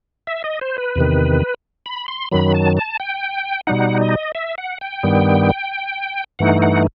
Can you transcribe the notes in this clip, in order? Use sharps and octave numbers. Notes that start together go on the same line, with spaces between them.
E5
D#5
C5
B4
E2 C3 D#3
B5
C6
F#2 D#3 F#3 B5
A5
A5
G5
B2 G3 D#4 F#5
D#5
E5
F#5
G5
G2 D#3 G3 B3
G2 E3 A3 D#4 F#5
F#5